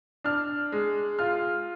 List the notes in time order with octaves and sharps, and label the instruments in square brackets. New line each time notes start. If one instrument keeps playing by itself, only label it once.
[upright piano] D4 F6
G#3
F4 F6